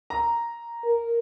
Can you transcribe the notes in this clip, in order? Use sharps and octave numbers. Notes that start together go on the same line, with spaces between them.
A#5
A#4